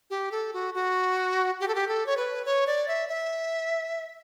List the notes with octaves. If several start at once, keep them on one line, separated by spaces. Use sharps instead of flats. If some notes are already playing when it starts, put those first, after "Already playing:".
G4
A4
F#4
F#4
G4
A4
G4
A4
C#5
B4
C#5
D5
E5
E5